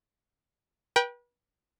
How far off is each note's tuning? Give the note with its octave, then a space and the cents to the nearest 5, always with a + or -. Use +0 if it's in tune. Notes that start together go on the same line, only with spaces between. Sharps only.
B4 -35 G5 +0